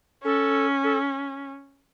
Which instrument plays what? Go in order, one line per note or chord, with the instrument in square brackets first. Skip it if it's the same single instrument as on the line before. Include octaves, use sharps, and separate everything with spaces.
[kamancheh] C#4 [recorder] A4
[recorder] A4